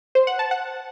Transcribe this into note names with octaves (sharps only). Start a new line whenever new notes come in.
C5
F#5
A5
F#5